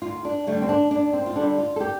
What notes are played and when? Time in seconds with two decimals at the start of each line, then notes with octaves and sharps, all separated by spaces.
0.02 D2 F4
0.25 D4
0.47 D3 G3 A3
0.62 C4
0.69 D4
0.91 D2 D4
1.13 C4
1.26 F4
1.36 D3 G3 D4
1.58 F4
1.76 A4
1.80 G4